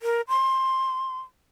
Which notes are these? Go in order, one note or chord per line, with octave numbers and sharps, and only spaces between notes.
A#4
C6